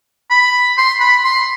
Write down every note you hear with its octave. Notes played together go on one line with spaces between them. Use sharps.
B5
C6
B5
C6